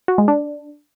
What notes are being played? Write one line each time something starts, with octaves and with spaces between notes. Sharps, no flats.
F#4
G#3
D4